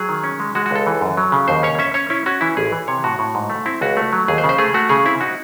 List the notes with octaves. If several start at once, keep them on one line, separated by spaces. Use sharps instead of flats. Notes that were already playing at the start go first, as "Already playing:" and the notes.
Already playing: F#3 G#4
D#3
C#4
G#3
G#3 F#4
F#4
C#2 A4
E3
F#2
F#3
C#3
D#2 C5
C#4 C#5
C#4 E5
C#4 C#5
C#4 E4
C#4 F#4
E3 E4
A1 G#4
E3
C3 C#5
A2 F#4
A2
G#2
A3
C4 E4
C#2 F#4
A3
F#3
D#2 G#4
C5
C#3
C5
A3 G#4
A3 F#4
C#3 G#4
C4 E4
D#4 F#4